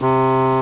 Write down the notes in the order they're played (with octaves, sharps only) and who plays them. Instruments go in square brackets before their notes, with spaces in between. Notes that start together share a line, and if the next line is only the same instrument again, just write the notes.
[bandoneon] C3